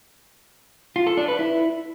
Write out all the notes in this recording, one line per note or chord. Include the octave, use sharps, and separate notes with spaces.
F4
A4
D4
B4
E4